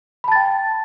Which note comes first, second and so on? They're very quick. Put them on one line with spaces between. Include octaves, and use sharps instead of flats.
B5 A5 A6 G5